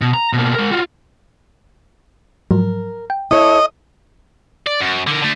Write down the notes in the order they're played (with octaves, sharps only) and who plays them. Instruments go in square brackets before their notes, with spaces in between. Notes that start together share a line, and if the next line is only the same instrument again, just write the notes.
[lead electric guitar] B2
A#5
B2 A#3
G#3 A#4
F4 F#4
[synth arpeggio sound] G#2 F3 F#3 [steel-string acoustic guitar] A#4
[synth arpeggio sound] G5
[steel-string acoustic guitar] E4 A4 C#5 [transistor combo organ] D#5
[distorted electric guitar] D5
F#2
D3 A#4
D3 A3